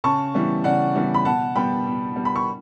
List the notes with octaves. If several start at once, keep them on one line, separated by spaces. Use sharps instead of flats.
C#3 A5 C#6
E3 G3 B3
C#3 D5 F#5
E3 G3 B3
B5
B2 F#5 A5
G3 B3 G5 B5
B2
G3 B3
B5
C#6